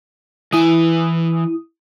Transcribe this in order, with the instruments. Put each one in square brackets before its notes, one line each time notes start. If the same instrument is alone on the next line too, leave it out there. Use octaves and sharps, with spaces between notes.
[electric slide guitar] E3 G#5 [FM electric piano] E4 D#6